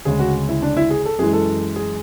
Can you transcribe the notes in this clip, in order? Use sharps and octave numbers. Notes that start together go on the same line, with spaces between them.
D2 C#3 G#3 G#4
F#4
E4
D4
E4
G#4
A4
F#2 E3 G#3 G#4
A4
G#4